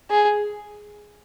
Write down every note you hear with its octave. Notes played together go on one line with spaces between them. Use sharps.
G#4